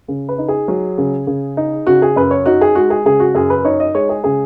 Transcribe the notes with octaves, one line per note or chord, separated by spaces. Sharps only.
C#3
B4
D#4
G#4
F#3
C#3
C#3
D#4
C#3 F#4
G#4
F#2 B4
C#5
D#4 F#4
G#4
G#3 F#4
G#4
C#3 G#4
F#4
F#2 G#4
B4
D#4 C#5
D#5
G#3 C#5
G#4
C#3 G#4